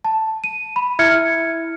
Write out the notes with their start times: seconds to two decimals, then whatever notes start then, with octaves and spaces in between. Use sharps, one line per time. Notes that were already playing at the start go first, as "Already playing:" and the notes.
0.05 A5
0.44 D#7
0.76 B5
0.99 E4 E5 F6 G#6 C#7